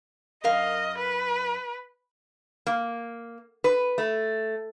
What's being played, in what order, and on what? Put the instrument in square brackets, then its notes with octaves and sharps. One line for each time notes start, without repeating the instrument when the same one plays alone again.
[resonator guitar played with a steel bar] F#2 A#4 F5 [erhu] D#5
[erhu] B4
[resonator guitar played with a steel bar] A#3
B4
A3